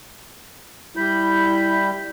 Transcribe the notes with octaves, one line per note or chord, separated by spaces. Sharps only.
G3 E4 B5 G6